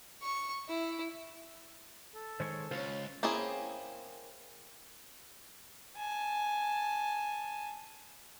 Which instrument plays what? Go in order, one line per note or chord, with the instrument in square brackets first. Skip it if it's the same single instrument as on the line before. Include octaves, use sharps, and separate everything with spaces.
[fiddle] C#6
E4
[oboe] A4
[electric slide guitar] D#3 G#3 C#5 [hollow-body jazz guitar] C5
[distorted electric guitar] C#2 [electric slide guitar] F4 [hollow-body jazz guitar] C5 C#5
[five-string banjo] A#3 C4 C#4 E4 G#4
[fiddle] G#5 A5